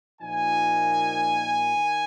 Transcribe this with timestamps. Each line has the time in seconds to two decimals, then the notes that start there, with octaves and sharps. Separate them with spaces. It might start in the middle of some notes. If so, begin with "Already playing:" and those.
0.20 A#2 F3 A#3 D#4 G#5
1.76 D#3